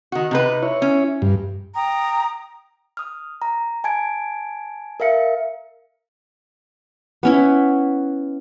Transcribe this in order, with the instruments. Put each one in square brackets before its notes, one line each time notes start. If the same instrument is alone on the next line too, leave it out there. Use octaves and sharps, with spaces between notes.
[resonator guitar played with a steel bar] D#3 F#4
C3 D#4 B4
[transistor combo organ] E4 C#5
[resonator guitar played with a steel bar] C#4
[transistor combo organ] G2
[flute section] G5 A#5 D#6
[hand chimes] D#6 F6
A#5
G#5 A5 G#6 D7
A#4 E5 F5 C#7
[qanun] B3 C#4 E4